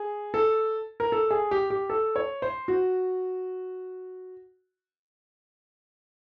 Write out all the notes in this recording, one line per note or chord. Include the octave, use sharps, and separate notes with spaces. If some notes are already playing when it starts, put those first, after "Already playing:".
Already playing: G#4
A4
A#4
A4
G#4
G4
G4
A4
C#5
C5
F#4